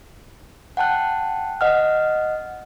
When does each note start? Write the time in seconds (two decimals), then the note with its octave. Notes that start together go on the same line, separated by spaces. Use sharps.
0.77 F#5 G5 A5 F#6
1.61 D#5 F#5 F6